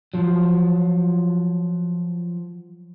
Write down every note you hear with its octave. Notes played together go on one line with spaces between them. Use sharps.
F3 F#3